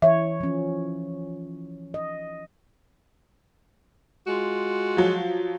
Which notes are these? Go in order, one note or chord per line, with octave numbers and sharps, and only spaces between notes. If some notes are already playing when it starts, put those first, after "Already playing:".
E3 C#5 E5
F3 C#4
D#5
G#3 F4 F#4
F3 F#3